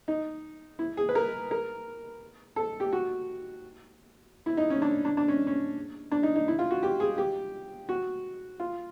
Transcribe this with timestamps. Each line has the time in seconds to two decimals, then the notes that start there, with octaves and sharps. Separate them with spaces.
0.08 D#4
0.79 E4
0.97 G#4
1.09 B4
1.15 A#4
1.51 A#4
2.56 A4
2.80 G4
2.93 F#4
4.46 E4
4.57 D#4
4.70 C#4
4.82 D4
5.05 D4
5.17 D4
5.28 C#4
5.47 C#4
6.12 D4
6.23 D#4
6.36 D#4
6.48 E4
6.59 F4
6.71 F#4
6.83 G4
7.00 G#4
7.18 G4
7.89 F#4
8.60 F4